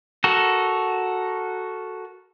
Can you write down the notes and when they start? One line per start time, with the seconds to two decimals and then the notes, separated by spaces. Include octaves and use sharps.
0.24 F#4 A4 A#4